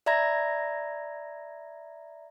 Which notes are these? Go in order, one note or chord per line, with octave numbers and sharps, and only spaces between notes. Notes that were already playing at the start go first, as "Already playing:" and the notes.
D5 E5 A#5 B5 G#6 A#6